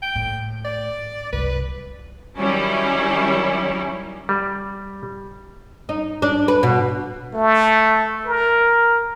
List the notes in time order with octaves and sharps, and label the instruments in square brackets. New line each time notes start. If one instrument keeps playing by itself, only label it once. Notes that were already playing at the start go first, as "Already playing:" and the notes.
[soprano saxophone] G5
[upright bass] A2
[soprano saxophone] D5
[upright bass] C2 F#2 [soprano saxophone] B4
[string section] D#3 F#3 G3 C#4 E4
[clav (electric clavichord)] G3
[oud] D#4
D4
B4
B2
[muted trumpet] A3
A#4